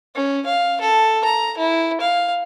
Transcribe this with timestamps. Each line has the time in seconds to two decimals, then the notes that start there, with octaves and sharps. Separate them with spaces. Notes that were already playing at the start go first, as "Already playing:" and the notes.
0.15 C#4
0.46 F5
0.81 A4
1.25 A#5
1.58 E4
2.01 F5